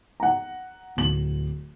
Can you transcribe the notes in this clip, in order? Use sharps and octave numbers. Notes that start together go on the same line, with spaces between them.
F#5 A#5
D1 F#7